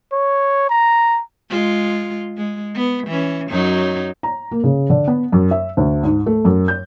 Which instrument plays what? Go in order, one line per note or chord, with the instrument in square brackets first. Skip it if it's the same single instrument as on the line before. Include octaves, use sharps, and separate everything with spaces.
[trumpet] C#5
A#5
[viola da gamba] G#3 F4
G#3
B3
E3 C#4
F#2 F#3 D#4
[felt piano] A#5
A#3
C#3
D3
B3
F#2
E5
D2
G#2
A3
F#2
G6